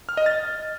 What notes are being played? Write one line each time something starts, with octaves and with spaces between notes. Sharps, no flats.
F6
D#5
A6